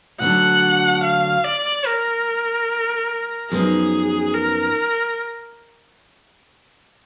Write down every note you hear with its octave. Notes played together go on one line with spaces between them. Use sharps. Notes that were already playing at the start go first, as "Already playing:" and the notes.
D2 D3 F#3 D4 F#5
F5
D5
A#4
F#2 F3 B3 D#4 G#4
A#4